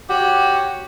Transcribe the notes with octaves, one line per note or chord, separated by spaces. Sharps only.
F#4 G4 C#5